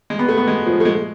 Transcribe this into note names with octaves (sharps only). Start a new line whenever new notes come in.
G#3
B3
A3
B3
G#3
F3
A3
G#3